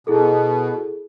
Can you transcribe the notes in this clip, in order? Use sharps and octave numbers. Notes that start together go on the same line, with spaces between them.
B2 E4 G#4 A4